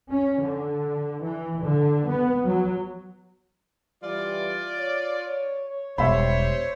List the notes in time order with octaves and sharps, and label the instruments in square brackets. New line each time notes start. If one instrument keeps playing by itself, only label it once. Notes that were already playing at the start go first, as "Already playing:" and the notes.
[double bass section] C#4
D3
E3
D3
B3
F#3
[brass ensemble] E3 G3 [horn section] F4 D5
[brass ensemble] C#5
[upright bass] E1 [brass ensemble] G3 [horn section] C5 C#5 [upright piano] E5 B5